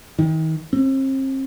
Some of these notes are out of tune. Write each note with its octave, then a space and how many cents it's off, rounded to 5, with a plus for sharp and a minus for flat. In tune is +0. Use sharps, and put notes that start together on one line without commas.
D#3 +35
C4 +40